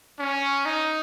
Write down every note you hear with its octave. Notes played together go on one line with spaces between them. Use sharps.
C#4
D#4